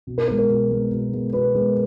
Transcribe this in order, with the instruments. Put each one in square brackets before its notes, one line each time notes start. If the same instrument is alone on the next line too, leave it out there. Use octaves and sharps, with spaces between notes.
[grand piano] B2
A#4
G#3 B3 A#4
A#4
B2
G#3 B3
B2
G#3 B3
B2 B4
G#3 B3